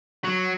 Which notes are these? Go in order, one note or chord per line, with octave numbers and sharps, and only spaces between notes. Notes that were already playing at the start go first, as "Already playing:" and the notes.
F#3